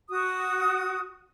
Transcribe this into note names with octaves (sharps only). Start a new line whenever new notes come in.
F#4 D#6